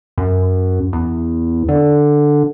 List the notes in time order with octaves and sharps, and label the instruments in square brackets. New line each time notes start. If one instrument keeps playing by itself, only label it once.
[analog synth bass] F#2
E2
D3